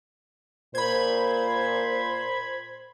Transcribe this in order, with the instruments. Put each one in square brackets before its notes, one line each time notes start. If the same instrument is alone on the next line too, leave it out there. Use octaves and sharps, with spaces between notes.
[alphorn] A#2 [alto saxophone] C5 [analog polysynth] B5 G#6